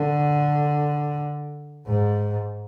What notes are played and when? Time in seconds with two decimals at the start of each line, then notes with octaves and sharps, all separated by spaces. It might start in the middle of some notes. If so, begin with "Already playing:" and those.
Already playing: D3
1.87 G#2